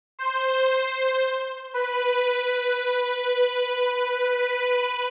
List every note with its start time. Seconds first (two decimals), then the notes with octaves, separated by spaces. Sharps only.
0.19 C5
1.74 B4